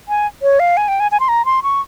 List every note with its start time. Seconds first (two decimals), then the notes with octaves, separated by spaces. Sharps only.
0.09 G#5
0.42 C#5
0.60 F5
0.77 G#5
0.88 G5
1.00 G#5
1.11 G#5
1.20 C6
1.29 A#5
1.45 C6
1.63 C#6